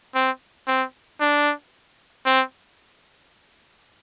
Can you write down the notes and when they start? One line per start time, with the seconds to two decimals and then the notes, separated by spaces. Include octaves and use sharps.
0.15 C4
0.68 C4
1.21 D4
2.26 C4